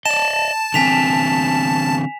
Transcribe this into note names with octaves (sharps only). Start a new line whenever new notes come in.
D5 D#5 A5 E7
D3 E3 C4 G#5 B6 F7